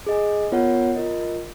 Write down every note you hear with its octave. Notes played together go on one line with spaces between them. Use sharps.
G#4 D#5 G#5
B3 F4 A#4 C#5 F#5
F4 A#4 D#5